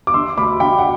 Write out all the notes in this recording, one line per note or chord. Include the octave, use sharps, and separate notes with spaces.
D6
D3 C6 E6
D2 B5 D6
D3 G5 B5
F#5